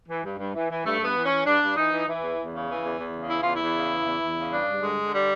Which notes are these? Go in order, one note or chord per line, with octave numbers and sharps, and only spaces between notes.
E3
G2
G2
E3
E3
G2 A3
G2 B3
E3
E3 C#4
G2 D4
G2
E3 D#4
E3
E3
E2
E2
C#3
E3
E2
E2
C#3
E3 E4
E2 F4
E2 E4
C#3
E3
E2
E2
C#3
G2 D4
G2
D3 G#3
D3
G3